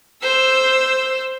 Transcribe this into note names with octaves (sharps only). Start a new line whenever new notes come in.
C5 E6